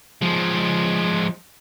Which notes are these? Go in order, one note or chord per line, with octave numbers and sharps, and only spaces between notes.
F3 G#3